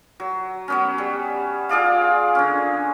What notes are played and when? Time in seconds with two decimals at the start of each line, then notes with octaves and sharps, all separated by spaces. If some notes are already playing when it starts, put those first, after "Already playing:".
0.20 F#3
0.68 F#3 B3 C#4
0.98 G3
1.69 F4 G#4 D5 F5
2.35 D3 C#4